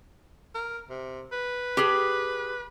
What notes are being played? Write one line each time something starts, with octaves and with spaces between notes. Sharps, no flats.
A#4
C3
B4
G4 G#4